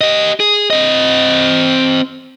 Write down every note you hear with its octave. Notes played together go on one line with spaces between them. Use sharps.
G4 D#5
G#4
C4 D#5